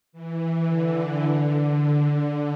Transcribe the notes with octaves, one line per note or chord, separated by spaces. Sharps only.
E3
D3
D3